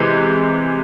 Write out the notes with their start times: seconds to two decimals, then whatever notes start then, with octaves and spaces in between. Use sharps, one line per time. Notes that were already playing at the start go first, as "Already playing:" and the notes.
Already playing: C3 E3 G#3